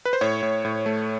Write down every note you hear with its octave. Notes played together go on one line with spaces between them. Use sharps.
B4
C5
A2 C#5
A2
A2
A3